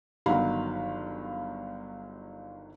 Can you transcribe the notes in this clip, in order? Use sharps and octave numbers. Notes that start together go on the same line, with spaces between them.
G1 D#3 F#3 F5 B5